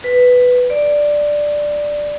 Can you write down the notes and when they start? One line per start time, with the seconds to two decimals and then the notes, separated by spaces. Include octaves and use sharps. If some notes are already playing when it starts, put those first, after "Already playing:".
0.04 B4
0.70 D5